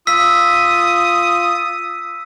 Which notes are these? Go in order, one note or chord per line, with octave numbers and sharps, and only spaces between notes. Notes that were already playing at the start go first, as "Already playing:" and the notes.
F4 D#6 E6 B6